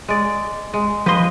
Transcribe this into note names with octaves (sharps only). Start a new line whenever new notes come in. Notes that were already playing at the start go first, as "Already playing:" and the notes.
G#3 D5
G#3
F3 B4 D#5 C6